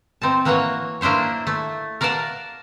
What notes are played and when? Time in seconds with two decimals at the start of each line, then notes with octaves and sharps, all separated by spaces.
0.22 C4 D#4 A5
0.45 E3 A#3 F#4 C#5 F#5
1.01 A#3 D4 E4 C5 C#5
1.47 A3
2.01 A#4 D5 F5 F#5 A5